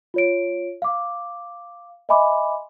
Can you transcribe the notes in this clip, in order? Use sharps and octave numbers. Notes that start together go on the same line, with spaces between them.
F4 C#5 D7
F5 D6
D#5 E5 G#5 B5 C6 D6